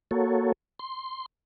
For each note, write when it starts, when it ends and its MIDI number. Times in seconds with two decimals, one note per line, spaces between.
0.11 0.52 58
0.11 0.52 66
0.11 0.52 69
0.11 0.52 73
0.79 1.26 84